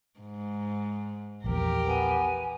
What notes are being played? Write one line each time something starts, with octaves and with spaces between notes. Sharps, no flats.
G#2
A#1 E2 G4 A#4
B3 G#5